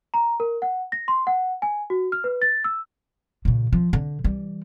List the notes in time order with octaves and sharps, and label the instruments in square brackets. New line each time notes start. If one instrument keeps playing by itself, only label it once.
[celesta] A#5
A#4
F#5
A#6
C6
F#5
G#5
F#4
F6
B4
A6
E6
[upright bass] A#2 C#3
F3
D3
E3 G3